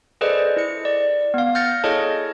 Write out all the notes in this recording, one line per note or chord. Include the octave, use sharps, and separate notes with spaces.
G#4 A4 B4 C5 D5 D#5
E4 C#7
D5
B3 F5
F6 G6 A6 A#6 C#7
E4 G#4 A4 C#5 D#5 A5